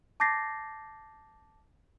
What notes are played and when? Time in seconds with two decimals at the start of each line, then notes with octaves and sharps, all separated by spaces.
0.20 A5 D6 G6 A6 A#6 C7